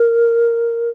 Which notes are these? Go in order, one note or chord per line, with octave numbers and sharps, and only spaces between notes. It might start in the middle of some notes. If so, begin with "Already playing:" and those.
Already playing: A#4